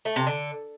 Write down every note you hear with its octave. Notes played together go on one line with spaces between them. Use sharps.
A3
C3
D3